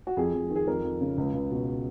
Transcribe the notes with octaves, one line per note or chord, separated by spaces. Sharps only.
F#4
F2 G#4
F2
D#3
G#4
F2 A#4
F2
C#3
C#2
C#2
B2